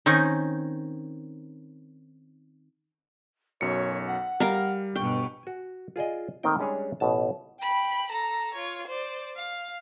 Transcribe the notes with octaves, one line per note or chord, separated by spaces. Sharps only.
D#3 C4 C#4 D#4
B1 F#2 C#5 C#7
F#5
G3 A#4 F5 A#5
G1 B2 G5 C#6
F#4 G#5
F4 G#4 D5 D#5
D#3 A3 A#3 C4 D#4 G5
G3 G#3 C#4 D4 G#4 C#5
A1 B2 A5
G5 B5
A4 A#5
F4 C#5
C5 D5
F5